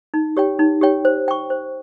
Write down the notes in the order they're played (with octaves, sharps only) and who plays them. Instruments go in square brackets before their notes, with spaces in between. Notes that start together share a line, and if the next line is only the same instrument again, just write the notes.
[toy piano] D#4
G4 C#5 G5
D#4
G4 C#5 G5
C5
G5 C#6
C5